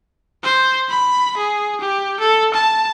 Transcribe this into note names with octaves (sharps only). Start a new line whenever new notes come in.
C5
B5
G#4
G4
A4
A5